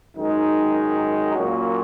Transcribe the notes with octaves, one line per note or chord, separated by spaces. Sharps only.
F#2 D#3 G#3 D#4
A#2 F#3 A#3 C#4 F#4